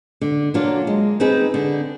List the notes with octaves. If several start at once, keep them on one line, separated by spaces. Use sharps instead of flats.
D3
F#3 A#3 D4 F4
G#3
C4 D#4 G#4 B4
D3